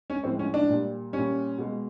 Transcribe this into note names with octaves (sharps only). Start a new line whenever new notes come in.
C#4
A2 F3 G#3 C4
C#4
D4
A#2 G3
A#2 G3 C#4
B2 G#3